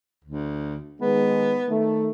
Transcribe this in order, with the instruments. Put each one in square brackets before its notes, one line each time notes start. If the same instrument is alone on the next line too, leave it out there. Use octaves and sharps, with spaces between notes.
[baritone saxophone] D2
[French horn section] D#3 G#3 [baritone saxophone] B3
[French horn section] D#3 A3